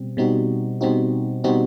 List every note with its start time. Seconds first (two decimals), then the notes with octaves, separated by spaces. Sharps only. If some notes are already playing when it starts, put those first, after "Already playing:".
Already playing: B2 G3 C4
0.17 B2 G3 C4 D#4 F#4
0.81 B2 G3 C4 D#4 F#4
1.44 B2 G3 C4 D#4 F#4